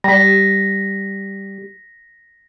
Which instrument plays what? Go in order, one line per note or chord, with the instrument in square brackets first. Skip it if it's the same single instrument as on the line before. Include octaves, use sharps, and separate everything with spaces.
[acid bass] G3 [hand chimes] A#6 B6